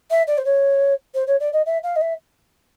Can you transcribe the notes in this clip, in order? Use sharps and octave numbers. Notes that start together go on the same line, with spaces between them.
E5
D5
C5
C#5
C5
C#5
D5
D#5
E5
F5
D#5
E5